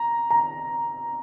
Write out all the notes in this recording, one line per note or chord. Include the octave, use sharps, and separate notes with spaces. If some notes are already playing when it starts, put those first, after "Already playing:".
Already playing: A#5
A#5